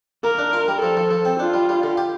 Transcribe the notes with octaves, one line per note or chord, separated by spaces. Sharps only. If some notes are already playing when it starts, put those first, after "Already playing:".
A#3 A#4
D4
F4
G3
F3 A4
F3
F3
C4
D4 F4
G3
G3
D3
G4